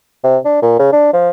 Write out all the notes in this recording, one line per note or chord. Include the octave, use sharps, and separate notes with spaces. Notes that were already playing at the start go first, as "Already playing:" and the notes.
C3
D4
A#2
C#3
D4
F3